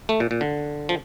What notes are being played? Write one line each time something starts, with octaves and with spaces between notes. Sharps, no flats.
A3
A#2
A#2
D3
F3